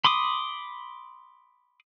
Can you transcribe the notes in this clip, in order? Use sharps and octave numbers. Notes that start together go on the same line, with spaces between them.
B5 C6 D6 D#6